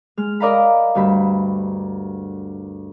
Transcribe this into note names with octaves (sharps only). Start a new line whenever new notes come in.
G#3 F6
A#4 D5 D#5 F5 A#5 B5
D2 G2 B5